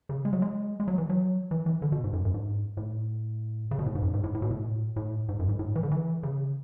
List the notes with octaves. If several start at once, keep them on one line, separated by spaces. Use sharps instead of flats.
C#3
G#3
F#3
G#3
G#3
F#3
E3
F#3
E3
E3
D3
B2
G#2
F#2
F#2
G#2
A2
C#3
B2
A2
G#2
F#2
G#2
A2
A2
B2
A2
A2
G#2
F#2
G#2
A2
E3
D3
E3
C#3